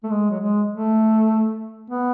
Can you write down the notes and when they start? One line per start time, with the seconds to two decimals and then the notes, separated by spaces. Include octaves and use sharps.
0.04 A3
0.11 G#3
0.31 F#3
0.40 G#3
0.71 A3
1.90 B3